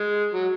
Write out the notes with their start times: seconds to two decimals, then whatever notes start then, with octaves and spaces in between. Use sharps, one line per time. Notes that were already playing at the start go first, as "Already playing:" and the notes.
Already playing: G#3
0.34 F#3